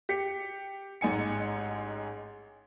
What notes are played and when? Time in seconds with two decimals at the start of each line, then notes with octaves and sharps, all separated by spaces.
0.09 G4 B6 C#7
1.01 A1 G#2 D#4 G#5 C#7